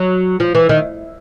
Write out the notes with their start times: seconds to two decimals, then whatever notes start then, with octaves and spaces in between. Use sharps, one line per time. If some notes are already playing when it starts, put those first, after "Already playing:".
Already playing: F#3
0.40 F3
0.55 E3
0.69 D#3